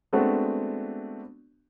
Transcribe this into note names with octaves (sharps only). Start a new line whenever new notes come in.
G#3 A3 B3 C4 D4 F#4